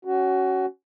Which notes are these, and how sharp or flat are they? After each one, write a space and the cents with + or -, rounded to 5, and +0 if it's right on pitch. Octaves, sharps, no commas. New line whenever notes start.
C#4 +0 F#4 +20